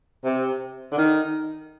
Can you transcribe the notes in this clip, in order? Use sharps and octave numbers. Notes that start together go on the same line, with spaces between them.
C3
D3
D#3